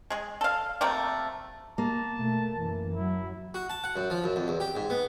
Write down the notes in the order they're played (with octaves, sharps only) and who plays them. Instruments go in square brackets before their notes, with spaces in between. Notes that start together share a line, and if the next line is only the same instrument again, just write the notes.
[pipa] G#3 G#4
A4 F5
C3 A3 A#3 C4
[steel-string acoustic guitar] A#3 [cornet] A5
[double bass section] B2 A3
F#2 E3
[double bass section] F#3 [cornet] E4
[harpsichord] F#4
A5
F#5
F#2
F3
F#2
F2
E2
G4
G#2
B3